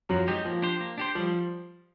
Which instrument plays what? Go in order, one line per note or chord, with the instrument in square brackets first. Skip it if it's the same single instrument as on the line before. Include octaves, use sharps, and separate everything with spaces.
[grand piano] F#2 F#3 [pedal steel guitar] F3
[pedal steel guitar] G#3 C4 D#4 G4
[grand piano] F3 [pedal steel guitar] A#3
[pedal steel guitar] D4 G4 C5
A#3
D4 G4 C5
[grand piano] F3 [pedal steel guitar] G3